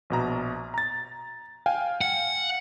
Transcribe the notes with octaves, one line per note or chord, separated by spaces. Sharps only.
A#1 B2 A#5
A#5 A6
F5 G5 G#5
F#5